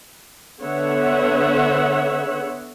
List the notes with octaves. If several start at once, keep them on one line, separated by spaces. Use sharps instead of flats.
D3 B3 C#5 E5 F#5